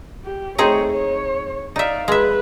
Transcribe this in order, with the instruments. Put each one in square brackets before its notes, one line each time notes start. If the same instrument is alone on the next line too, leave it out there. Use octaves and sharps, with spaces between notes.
[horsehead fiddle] G4
[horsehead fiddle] A3 C#5 [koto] C4 D#4 G#4
[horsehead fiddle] C#5
[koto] D#4 E5 [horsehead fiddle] D5 F5
[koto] G#3 E5 [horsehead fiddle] B4